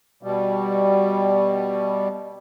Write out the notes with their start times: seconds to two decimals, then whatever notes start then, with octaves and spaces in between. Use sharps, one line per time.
0.23 B2 G3